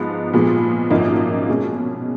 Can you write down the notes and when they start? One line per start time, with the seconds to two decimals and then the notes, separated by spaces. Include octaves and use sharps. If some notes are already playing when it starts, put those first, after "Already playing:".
Already playing: G#2 F3 B3 D#4
0.34 A#2 F3 G#3 B3
0.90 G#1 F#2 F3 A#3 D#4
1.49 B2 G#3 C#4